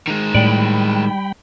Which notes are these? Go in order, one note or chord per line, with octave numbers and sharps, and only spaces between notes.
D#3 G#3
A2 G3 G5 B5